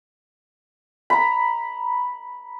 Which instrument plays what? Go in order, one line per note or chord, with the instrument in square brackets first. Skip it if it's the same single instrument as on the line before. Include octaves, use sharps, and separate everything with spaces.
[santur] A#5 B5